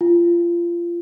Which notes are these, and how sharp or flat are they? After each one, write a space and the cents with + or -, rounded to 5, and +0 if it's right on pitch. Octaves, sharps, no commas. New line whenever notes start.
F4 -25